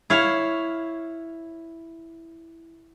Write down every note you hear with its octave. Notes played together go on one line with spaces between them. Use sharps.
E4 C#5 F5